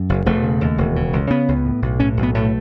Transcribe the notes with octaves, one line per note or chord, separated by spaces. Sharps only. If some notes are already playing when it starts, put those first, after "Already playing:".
Already playing: F#2
F#1
E1 A3
C#3
D#2
E1
C#3
C#2
C#3 B3
C#2
A2
B1
A2 C#4
B1
B3
A2 A3